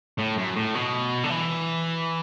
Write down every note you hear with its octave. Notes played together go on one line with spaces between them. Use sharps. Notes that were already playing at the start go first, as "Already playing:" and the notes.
A2
F#2
A2
B2
D3
E3